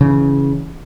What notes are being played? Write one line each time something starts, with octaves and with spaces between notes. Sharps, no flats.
C#3 E3